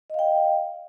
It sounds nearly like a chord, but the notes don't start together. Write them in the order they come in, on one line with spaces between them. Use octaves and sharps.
D#5 F5 G5